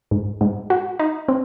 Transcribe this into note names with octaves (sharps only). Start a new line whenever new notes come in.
G#2
G#2
F#4
D#4
C4